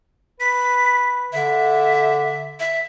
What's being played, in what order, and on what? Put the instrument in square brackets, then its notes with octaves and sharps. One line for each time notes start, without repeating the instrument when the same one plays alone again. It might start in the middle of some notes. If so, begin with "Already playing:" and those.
[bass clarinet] B4 [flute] B6
[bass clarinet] D3 [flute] E5
[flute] E5